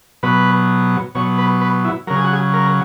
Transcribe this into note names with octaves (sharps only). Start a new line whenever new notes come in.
B2 F#3 B4
B2 F#3 C#5
B4
B4
E4
C#3 F#3 A#4
G#4
F#4
G#4
A#4